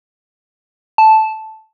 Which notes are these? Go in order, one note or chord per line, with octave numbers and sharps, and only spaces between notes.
A5